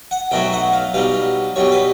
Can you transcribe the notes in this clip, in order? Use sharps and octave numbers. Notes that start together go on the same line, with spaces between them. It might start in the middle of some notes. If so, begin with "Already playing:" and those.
F#5
B1 B2 F#3 A3 G5
F#5
F5
B1 B2 G3 F5
B1 B2 G3 C#5
B4